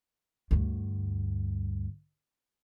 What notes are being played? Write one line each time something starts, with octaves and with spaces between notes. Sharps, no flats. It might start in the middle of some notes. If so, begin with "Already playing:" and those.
D2 G2